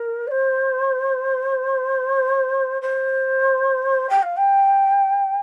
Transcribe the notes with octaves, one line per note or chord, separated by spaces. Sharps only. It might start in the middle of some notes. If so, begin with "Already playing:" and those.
Already playing: A#4
D5
C5
C5
G5
F5
G5